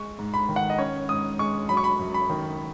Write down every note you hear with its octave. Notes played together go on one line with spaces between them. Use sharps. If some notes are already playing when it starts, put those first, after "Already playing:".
Already playing: G#3 C#6
G#2
B5
D#3
F#5
D#5
C#4 C#5
G#2 D#6
G#3 C#6
F#3 B5
C#6
B5
F#2
B5
D#3